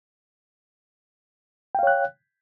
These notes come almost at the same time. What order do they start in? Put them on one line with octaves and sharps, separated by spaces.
G5 F5 C#5 F#6